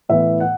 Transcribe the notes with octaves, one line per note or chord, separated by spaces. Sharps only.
A2 E3 B3 E5
F#5